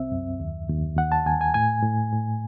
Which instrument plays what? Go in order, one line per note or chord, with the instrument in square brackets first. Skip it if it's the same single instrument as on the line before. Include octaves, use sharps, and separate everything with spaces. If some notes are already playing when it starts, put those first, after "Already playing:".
Already playing: [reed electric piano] C2 C4 E5
F#2
D#2
D#2
D#2 F#5
A5
D#2 G#5
G#5
A2 G#5
A2
A2